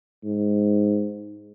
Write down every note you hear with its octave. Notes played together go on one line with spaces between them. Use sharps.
G#2